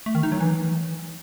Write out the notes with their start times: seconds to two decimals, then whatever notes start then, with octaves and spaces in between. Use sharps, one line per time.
0.06 A3
0.15 D#3
0.23 D#4
0.32 F#3
0.40 E3